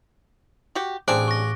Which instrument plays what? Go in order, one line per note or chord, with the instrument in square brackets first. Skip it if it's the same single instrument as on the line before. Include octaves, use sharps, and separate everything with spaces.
[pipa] F#4 G4
[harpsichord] A1 G#4 [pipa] G3 C4 D4 [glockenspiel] D6 F#6 D7
[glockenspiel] C#6 A#6